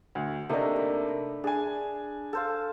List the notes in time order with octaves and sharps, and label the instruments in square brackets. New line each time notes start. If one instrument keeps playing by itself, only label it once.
[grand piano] D2
[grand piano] C3 A#3 D#4 [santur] A3 D4
[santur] B5
[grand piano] D4 G#5 [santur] G#4
[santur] A4 C5 F5